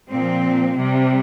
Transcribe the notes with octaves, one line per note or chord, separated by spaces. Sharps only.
A#2 F3 C4
C3 G3